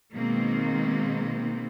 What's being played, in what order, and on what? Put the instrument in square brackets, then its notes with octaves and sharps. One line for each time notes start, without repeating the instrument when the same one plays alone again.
[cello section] B2 D#3 G#3 A#3 C4